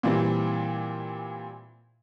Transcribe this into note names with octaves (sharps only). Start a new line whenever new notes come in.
A#2 E3 G3 C4